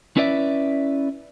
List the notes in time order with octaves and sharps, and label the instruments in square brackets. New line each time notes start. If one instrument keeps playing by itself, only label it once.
[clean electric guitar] C#4 E4 B4 D5 E5